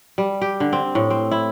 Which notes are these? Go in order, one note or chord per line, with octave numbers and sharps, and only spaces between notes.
G3
G4
D3
C4
A2
C4
E4